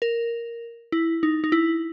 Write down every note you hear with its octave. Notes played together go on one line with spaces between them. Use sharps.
A#4
E4
D#4
D#4
E4